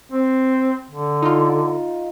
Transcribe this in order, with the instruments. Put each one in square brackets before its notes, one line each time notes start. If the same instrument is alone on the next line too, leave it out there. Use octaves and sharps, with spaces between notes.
[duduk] C4
D3
[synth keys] D#4 F4